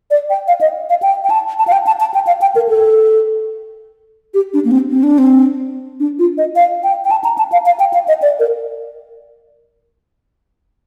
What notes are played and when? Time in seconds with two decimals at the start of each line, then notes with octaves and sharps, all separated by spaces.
0.11 D5
0.30 G5
0.48 F5
0.61 D#5
0.89 F5
1.02 G5
1.24 G5
1.30 A5
1.59 A5
1.67 F5
1.72 G5
1.87 A5
2.00 A5
2.14 G5
2.27 F5
2.41 G5
2.55 A#4
2.69 A4
4.34 G4
4.54 D4
4.65 A#3
4.71 C4
4.91 C4
5.03 D4
5.18 C4
6.00 D4
6.19 F4
6.38 D#5
6.56 F5
6.84 G5
7.05 G5
7.11 A5
7.24 A#5
7.38 A5
7.52 F5
7.66 F5
7.80 G5
7.94 F5
8.08 D#5
8.22 D5
8.40 A#4